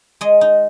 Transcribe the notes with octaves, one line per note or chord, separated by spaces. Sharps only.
G#3 D#5
D#4